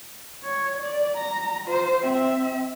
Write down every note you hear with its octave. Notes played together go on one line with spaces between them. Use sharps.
C#5
D5
A#5
F4 C5
C4 E5